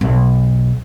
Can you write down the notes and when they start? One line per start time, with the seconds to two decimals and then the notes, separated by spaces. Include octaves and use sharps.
0.01 B1